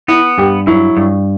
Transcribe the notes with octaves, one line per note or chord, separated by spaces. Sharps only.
B3 E4
G2 G4
F#3 E4
G2